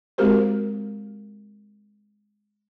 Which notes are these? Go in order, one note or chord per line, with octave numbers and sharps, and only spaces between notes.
G#3 C4 F#4 G4 A#4 C5